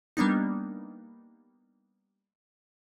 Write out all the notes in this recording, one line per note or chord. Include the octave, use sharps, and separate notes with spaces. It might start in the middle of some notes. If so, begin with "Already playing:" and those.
G3 A#3 B3 D4 D#4